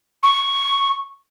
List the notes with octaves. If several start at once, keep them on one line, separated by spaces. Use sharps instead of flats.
C#6